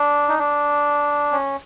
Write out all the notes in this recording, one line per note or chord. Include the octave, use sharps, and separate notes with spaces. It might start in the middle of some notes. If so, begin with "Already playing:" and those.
Already playing: D4
D#4
D4
C#4